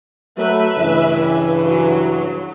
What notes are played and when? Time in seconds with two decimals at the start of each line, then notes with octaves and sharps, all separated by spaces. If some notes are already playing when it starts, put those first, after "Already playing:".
0.38 F#3 A3 B4 E5
0.78 G2 C#3 E3
1.64 F#3